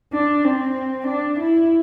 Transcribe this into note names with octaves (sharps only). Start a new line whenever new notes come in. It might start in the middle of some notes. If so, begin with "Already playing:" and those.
D4
C4
D4
E4